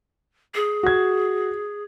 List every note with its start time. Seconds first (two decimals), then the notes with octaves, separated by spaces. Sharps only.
0.54 G#4
0.83 F#4 G#6